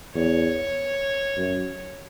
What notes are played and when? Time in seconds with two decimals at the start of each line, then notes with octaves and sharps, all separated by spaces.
0.15 E2 C#5
1.36 F#2